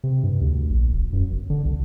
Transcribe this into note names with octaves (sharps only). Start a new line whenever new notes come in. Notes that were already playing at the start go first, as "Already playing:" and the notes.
C3
G2
D2
A#1
D1
F#2
G1
D3
C2